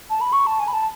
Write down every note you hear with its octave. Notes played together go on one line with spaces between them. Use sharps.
A5
B5
C#6
A5
G#5
B5
A5